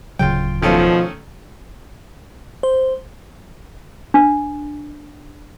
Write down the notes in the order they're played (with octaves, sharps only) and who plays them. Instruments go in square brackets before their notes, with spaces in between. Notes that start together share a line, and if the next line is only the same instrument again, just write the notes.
[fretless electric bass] D1 C#3 F#3 [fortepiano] F4 G5
[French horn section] B2 F3 [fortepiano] D#3 A3 C#4
[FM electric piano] C5
[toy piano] D4